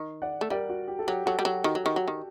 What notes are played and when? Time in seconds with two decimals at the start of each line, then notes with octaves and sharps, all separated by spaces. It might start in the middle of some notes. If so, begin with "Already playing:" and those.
Already playing: D#3
0.22 D5 F#5
0.41 A3
0.50 G3 A#4 D5
0.69 F#4
0.88 G4
0.99 A4
1.07 F#3 G4
1.26 F#3 F#4 A4
1.39 G3
1.45 F#3 G4
1.64 D#3 F#4
1.75 F#3
1.84 D#3 G4
1.96 F#3
2.08 D#3